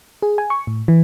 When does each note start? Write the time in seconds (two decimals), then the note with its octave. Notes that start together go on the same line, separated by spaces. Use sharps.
0.22 G#4
0.38 G#5
0.50 C#6
0.67 A2
0.88 E3